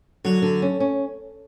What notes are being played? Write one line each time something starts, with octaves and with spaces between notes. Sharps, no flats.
D3 F#3
D3
C#4
C#4